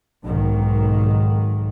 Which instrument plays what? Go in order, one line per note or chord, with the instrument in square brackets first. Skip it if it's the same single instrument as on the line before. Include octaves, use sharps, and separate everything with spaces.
[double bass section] B1 G#2 D#3